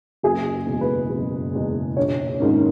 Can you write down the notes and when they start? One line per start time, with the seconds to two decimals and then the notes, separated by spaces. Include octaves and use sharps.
0.23 F#1 G#4
0.66 E2 B2 G#3
0.81 B4
1.10 F#1
1.53 E2 B2 G#3
1.97 A#1 C#5
2.40 G#2 D#3 A#3 C#4